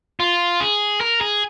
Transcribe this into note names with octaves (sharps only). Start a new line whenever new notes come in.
F4
G#4
A#4
G#4